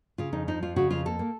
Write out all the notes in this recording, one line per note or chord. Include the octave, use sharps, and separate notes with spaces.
C#3 F4
F2 D#4
F3 D#4
F2 F4
C#3 F#4
F2 F4
A#3 A4
A#3